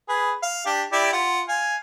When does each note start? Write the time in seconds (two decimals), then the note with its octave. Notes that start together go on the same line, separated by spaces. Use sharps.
0.09 G#4 B4
0.43 F5
0.66 D4 G4
0.92 E4 G4 D5
1.13 F4 F#5
1.48 F5 G#5